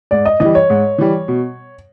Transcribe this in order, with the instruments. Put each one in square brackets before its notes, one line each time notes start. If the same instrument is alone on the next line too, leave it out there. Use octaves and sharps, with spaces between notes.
[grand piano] G#2 [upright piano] D5
[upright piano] D#5
[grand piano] E3 G3 [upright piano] D#5
[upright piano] C#5
[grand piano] G#2
E3 G3
B2